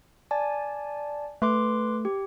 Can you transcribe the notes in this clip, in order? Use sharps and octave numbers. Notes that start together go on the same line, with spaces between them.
D5 G#5 A5
A3 B4 C6 D6
G4